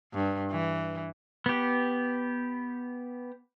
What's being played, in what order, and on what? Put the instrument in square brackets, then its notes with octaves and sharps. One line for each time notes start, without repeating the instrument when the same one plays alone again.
[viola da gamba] G2
E3
[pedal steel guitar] B3 G4